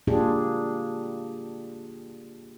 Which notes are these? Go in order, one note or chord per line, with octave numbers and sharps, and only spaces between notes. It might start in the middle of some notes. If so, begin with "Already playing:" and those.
A#3 D4 F4 G4 G#4